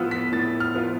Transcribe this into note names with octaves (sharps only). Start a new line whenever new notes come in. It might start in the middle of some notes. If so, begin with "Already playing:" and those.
Already playing: A2 F3 B3 F4 E6 F6
B6
A2 A6
F6
F3 B3 F4